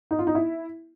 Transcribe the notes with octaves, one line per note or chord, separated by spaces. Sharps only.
D#4
F4
D#4
E4